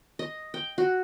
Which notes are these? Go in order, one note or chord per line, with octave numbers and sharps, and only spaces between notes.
D#5
G5
F#4